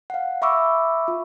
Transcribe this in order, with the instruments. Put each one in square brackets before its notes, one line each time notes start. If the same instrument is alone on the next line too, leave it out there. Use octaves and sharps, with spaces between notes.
[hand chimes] F5 F#5
E5 B5 C#6 D6 E6
F4